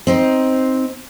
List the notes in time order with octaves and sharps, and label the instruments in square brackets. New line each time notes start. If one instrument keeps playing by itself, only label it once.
[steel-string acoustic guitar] C4 D#4 C5